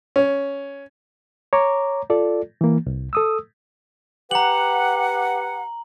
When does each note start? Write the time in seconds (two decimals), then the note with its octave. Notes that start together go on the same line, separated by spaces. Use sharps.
0.16 C#4
1.53 C#5 A#5 D6
2.10 F4 A4 D5
2.61 E3 A#3
2.86 C2
3.13 A4 D#6 E6
4.31 G4 B4 F#5 A#5 F#7